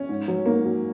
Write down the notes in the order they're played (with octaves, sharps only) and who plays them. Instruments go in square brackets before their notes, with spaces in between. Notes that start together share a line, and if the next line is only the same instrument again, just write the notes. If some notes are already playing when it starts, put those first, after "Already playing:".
Already playing: [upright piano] C#4
G#2
F#3
G#2 A#3
F#3